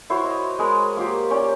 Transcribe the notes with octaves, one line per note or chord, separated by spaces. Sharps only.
E4 F#4 C5 C#5
D#5
G#3 A#4 C#5 B5
A#3 F4 G4
C#4 G4 C#5 D5